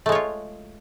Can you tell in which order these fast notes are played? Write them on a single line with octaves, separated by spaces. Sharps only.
A3 G#3 C#5 F4